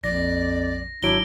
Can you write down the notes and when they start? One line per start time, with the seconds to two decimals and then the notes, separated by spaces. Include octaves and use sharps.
0.04 A#1 F2 D5 A#6
1.03 G#1 F#3 D4 E4 D7 G7